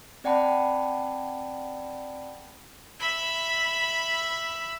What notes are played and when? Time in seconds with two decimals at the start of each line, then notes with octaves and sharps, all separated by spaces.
0.24 C4 D5 F#5 G5 A5 B5
2.99 E5 B5